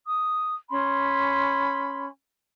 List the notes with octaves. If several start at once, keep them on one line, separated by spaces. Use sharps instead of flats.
D#6
C#4 B5 C6